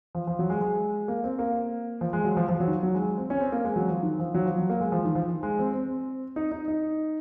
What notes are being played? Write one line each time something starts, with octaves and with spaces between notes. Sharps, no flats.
F3
F3
F#3
G#3
G#3
A#3
C4
A#3
F3
G#3
F#3
F3
F3
F#3
D#3
F3
F#3
G#3
C4
C#4
C4
A#3
G#3
F#3
F3
D#3
F3
F#3
F3
F#3
A#3
G#3
F3
D#3
F3
G#3
C4
C4
D#4
D#4
D#4